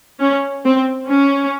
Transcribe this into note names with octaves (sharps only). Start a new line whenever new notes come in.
C#4
C4
C#4